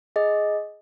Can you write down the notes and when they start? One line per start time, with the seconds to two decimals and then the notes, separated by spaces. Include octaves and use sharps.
0.16 G#4 D#5